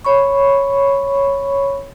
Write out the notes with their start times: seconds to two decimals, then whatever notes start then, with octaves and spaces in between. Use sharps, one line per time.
0.05 C#5 B5 C#6